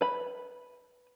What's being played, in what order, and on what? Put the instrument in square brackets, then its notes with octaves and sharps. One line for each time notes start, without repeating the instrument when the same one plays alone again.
[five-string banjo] B4 B5